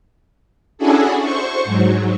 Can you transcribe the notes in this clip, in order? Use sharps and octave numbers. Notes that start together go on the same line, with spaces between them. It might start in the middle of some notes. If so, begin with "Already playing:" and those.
C#4 D4 E4 F#4 G#4 A4
C5 C#6
G#2 F#3